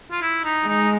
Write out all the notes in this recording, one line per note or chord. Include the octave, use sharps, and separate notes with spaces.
F4
E4
D#4
G#3 D#4